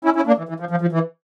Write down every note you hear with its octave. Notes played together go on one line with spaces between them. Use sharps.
C#4 E4
C#4 E4
A#3 D4
E3
E3
F3
F3
F3
E3